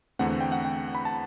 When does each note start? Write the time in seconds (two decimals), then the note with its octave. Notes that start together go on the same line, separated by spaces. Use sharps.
0.19 E2 D3 A3 C4 F#5
0.41 G5
0.52 F#5
0.65 G5
0.95 B5
1.05 A5